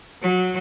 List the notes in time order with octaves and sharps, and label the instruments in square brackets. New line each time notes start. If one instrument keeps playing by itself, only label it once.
[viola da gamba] F#3